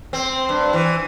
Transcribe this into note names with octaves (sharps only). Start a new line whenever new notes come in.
C4
G2
E3